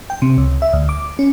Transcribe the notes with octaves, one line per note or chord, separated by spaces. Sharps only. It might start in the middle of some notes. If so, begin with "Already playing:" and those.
G5
C3
C#2
E5
D2
D6
C#4